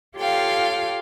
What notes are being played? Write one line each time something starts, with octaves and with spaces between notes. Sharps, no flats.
F4 G4 A4 C#5 F5 G5